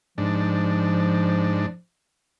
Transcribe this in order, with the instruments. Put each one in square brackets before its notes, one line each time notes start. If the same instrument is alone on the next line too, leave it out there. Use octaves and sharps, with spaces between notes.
[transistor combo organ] G#2 D4 [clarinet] F3